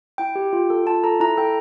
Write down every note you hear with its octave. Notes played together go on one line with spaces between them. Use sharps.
E4 G5
G4
F4
A4
F4 A5
A4 A#5
E4 A#5
A4 G5